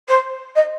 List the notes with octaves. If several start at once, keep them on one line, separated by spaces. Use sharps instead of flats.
C5
D#5